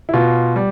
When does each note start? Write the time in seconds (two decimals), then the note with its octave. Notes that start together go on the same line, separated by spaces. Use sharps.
0.09 E4
0.14 B2 F4
0.56 G3